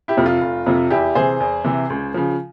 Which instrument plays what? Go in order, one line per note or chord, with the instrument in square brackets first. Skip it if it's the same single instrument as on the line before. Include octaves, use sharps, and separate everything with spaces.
[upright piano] E4 G4
F2 C3 F3
F4
F1
F2 C3 F3
E2 E4 G4
C3 E3 G#4 C5
E2
C3 E3
C#2
C#3 F3